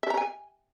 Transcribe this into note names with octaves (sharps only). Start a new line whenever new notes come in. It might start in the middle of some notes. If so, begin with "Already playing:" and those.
E5
A#5
G#5